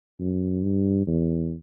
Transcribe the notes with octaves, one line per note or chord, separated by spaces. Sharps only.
F#2
G2
E2